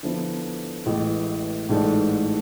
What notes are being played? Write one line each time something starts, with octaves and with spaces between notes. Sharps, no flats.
D3 F3 B3 E4
A1 A2 E3 G#3
A1 G#2 E3 A3 D4